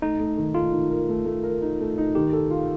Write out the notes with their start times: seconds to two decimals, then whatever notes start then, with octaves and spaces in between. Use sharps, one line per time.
0.02 A3 D#4
0.20 A3
0.37 D#3
0.54 A3 F4
0.72 D#3
0.91 A#4
1.09 A3
1.25 A3
1.43 A#4
1.62 D#4
1.80 A3
1.98 D#4
2.15 D#3 G4
2.33 A4
2.50 F4